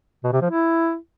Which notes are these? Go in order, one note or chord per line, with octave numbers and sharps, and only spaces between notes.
B2
C3
F3
E4